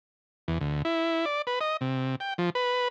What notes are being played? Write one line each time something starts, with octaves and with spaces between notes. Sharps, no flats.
E2
D2
E4
D5
B4
D#5
C3
G5
F3
B4